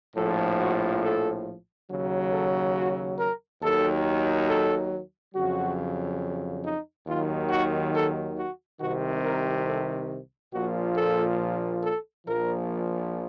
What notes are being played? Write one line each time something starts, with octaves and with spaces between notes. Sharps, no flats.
A#1 A2 F3 A4
F#4
A4
D#2 C#3 F#3
A4
F#4
A#4
D#2 D#3 F#3 A4
A4
F2 C#3 F#3 F#4
D#4
D#2 D#3 F#3 F4
F#4
A4
F#4
C2 C3 D#3 F#4
A#4
A4
A#1 A#2 F3 F#4
A4
A4
A#1 A#2 F3 A#4